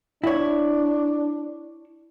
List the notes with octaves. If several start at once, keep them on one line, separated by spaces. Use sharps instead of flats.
D4 E4 C#5